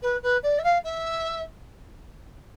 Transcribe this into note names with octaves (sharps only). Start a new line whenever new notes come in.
B4
B4
D5
E5
F5
E5